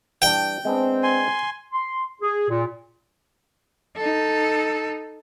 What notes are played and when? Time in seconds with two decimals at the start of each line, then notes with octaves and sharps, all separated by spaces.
0.22 E3 G3 D4 G5
0.65 G#3 B3 C4 D4
1.03 G#5 C6
1.73 C6
2.21 G#4
2.49 A#2
3.96 D#4 A4